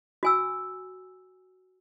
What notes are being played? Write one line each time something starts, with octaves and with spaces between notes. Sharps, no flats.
F#4 G#5 E6